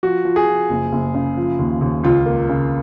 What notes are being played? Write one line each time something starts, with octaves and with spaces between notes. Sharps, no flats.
F3 F#4
F3
G#4
F3
F#1
F#1
C#3
F3
D#2
D#2
C#2 F4
A#3
C#3